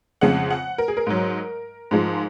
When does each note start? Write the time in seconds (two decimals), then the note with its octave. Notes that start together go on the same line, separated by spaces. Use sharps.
0.21 F2 C#3 G#3 F#5
0.51 F#5
0.78 A#4
0.88 G#4
0.97 A#4
1.07 G#2 F#3
1.91 G#2 F3 G#3